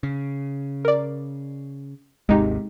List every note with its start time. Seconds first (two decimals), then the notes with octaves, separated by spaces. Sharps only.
0.03 C#3
0.85 A#4 D5
2.29 G#1 D#2 C3 G#3 D#4 G4